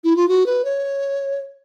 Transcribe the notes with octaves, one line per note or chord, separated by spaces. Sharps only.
E4
F4
F#4
B4
C#5